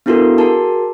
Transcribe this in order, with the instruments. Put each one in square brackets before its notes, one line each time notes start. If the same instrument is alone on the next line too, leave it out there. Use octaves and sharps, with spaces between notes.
[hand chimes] B3 D4 E4 F#4 A4 A#4
F#4 G#4 A#4 A5